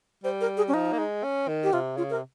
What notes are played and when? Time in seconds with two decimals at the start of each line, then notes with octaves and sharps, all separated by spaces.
0.24 G3 C5
0.41 A#4
0.57 G#4
0.68 C#4
0.73 F3 D#4
0.92 A#3
0.99 G#3
1.23 C#4
1.48 D#3
1.63 G4
1.73 C3 F4
1.97 C#3 F4
2.10 A#4
2.13 C3